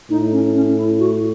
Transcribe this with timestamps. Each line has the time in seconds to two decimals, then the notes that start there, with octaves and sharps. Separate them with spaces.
0.10 A2 D#4
0.32 C#4
0.54 C#4
0.77 E4
0.99 F#4